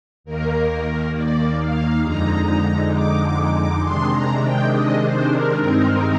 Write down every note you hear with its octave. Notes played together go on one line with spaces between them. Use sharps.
D#2 D#3 A#3 A#4
D5
F5
F2 D3 G#3 D#4 A#5
D6
D6
D6
C3 D#3 G#3 D4 C6
A#5
G5
D#5
C5
A#4
G2 D#3 G#3 C4 D#4